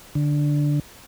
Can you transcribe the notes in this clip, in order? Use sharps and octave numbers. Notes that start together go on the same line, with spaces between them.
D3